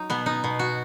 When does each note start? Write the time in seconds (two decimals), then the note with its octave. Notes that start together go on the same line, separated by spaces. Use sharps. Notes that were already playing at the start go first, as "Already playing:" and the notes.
Already playing: F#3 D#4
0.10 B2 B3
0.26 D#4
0.44 B2
0.59 F#4